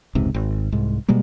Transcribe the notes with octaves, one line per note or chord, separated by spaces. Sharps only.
F1 C#2 G#2 C3
G#1
C2 G#2
B2 G3 G#3 A#3